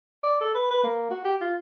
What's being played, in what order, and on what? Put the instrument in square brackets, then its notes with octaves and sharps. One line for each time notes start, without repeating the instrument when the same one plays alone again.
[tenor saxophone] D5
A4
B4
B4
A#3
F#4
G4
F4